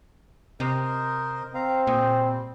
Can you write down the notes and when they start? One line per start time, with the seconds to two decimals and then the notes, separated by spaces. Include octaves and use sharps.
0.60 C3 A#4 C5 D#5
1.55 C4 F5 A#5
1.87 A#2 G#4 C5 D#5
2.19 G3